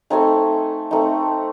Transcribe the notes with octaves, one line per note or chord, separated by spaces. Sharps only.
A3 C4 D#4 G#5
A3 C4 D#4